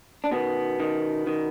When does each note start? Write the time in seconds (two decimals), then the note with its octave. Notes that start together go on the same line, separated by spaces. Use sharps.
0.24 D4
0.31 B2 D#3 B3
0.80 D#3
1.27 D#3